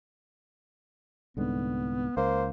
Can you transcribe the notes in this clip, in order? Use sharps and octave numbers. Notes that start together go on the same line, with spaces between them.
C2 G#2 D3 B3
C#2 A#3 C5